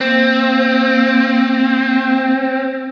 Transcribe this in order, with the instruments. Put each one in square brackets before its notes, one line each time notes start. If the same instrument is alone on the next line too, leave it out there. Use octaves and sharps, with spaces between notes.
[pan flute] A#3 [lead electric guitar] C4